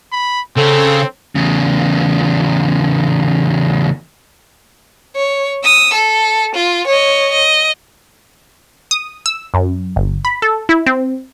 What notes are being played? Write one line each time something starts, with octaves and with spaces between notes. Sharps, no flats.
B5
C#3 C4 A4
E2 C#3
C#5
D#6 E6
A4
F4
C#5 D#5
D#5
D#6
E6
F#2
G1
B5
A4
E4
C4